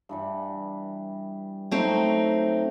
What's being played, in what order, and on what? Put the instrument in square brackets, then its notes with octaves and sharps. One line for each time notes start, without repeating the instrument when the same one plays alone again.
[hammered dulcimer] G2 E3 G3
[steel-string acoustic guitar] F#3 C4 D#4 [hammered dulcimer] A3 G5